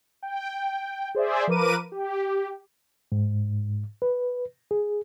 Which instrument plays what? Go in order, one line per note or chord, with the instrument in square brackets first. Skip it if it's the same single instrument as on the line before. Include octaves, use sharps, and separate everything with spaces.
[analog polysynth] G5
G#4 C5 D5 E5
F3 A#4 B4 D6 D#7
G4
[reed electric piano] G#2
B4
G#4